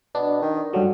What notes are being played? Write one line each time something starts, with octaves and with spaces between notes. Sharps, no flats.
B2 D4
D#3
G2 D3 F#3